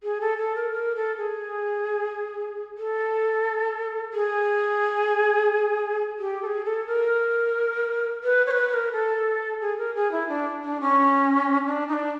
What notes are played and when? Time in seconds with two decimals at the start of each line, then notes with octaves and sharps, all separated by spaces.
0.03 G#4
0.21 A4
0.38 A4
0.56 A#4
0.72 A#4
0.95 A4
1.17 G#4
2.78 A4
4.13 G#4
6.19 G4
6.42 A4
6.46 G#4
6.65 A4
6.87 A#4
8.23 B4
8.46 C#5
8.51 B4
8.69 B4
8.73 A#4
8.92 A4
9.61 G#4
9.78 A#4
9.95 G#4
10.12 E4
10.29 D4
10.62 D4
10.81 C#4
11.66 D4
11.88 D#4
11.93 D4